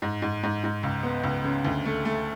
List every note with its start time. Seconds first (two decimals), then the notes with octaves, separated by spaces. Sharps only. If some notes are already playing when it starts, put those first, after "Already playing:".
0.02 G#2
0.22 G#2
0.43 G#2
0.64 G#2
0.83 C#2
1.03 B3
1.23 C#2
1.44 C#3
1.65 D2
1.85 A3
2.05 A3